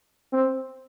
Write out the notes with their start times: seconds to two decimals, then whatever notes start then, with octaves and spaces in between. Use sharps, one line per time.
0.33 C4